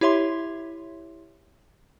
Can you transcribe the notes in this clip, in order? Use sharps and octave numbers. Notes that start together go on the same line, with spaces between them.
E4 G4 C#5 E5 C6